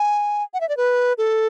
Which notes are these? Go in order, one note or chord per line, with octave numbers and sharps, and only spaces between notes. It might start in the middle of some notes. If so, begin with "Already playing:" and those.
Already playing: G#5
F#5
E5
D5
B4
A4